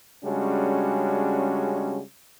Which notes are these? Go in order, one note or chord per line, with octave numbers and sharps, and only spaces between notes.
C#3 G3 G#3 C#4 D4 F#4